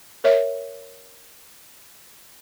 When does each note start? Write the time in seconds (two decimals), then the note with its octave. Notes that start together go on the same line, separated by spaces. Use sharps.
0.24 A#4 C#5 E5